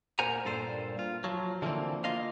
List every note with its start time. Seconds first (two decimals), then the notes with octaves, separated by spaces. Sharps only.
0.19 A#2 A#4 C5 F#5 G#5 A#5
0.45 G2 A#2 A4 C5
0.99 F4
1.24 F3 F#3
1.62 D3 E3 F3 A3 A#3 C4
2.04 A#3 F4 D#5 F5